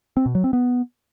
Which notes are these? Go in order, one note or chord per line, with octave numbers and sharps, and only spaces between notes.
C4
B2
F#3
C4
B3